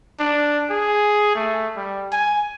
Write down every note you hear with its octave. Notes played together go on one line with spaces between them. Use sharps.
D4
G#4
A3
G3
G#5